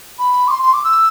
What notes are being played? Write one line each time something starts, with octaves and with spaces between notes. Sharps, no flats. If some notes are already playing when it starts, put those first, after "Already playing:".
B5
D6
C6
C6
D6
E6